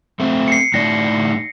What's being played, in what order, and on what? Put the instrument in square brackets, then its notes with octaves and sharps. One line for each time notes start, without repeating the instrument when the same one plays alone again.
[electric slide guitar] A3 C4
[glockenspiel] C7 C#7
[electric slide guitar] A2 D#4 D5 [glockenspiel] A#6